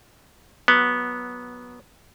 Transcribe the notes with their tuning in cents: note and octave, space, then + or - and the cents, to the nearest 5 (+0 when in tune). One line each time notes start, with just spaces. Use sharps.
F#3 +0 B3 -10